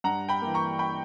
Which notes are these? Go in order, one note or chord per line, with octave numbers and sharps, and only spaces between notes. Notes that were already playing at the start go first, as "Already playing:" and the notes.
G2 F#5 A#5
G5 B5
E3 A#3
A#5 C#6
G5 B5